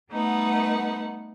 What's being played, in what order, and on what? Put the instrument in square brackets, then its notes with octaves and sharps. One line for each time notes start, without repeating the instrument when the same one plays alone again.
[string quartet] G3 A3 B3 D#4 B4 F#5